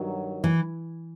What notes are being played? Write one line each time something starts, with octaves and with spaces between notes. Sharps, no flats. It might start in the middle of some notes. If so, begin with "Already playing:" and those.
Already playing: G2 D#3 F#3
E3